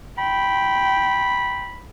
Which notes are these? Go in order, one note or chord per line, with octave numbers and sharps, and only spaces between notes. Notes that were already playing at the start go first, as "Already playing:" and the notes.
G5 B5